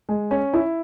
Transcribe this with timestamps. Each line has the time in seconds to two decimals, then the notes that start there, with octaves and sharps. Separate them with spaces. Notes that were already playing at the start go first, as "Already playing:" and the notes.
0.09 G#3
0.31 C#4
0.54 E4